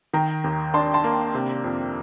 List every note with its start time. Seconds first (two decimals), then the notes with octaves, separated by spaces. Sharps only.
0.13 D#3 G5 A#5
0.44 D#2
0.74 D4 A5 C6
0.94 A5 C6
1.04 A#3
1.35 C3
1.64 F2